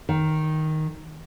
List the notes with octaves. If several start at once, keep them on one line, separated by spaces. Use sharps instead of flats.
D#3